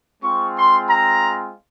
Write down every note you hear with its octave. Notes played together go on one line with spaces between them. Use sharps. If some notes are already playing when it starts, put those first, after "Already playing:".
G#3 C4 F4 C#6
C6
A#5